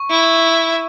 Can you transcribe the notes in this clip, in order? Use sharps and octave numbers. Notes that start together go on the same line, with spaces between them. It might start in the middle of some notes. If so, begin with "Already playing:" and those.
Already playing: C#6
E4